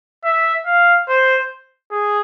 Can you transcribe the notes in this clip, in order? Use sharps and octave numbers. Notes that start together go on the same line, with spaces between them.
E5
F5
C5
G#4